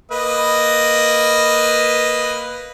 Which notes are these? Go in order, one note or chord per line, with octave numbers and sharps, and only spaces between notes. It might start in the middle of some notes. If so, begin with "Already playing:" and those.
A#3 B4 D#5